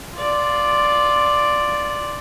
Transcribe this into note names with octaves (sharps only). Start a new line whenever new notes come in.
F4 D5